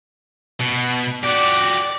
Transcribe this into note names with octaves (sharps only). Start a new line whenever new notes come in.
B2
F#4 G4 D5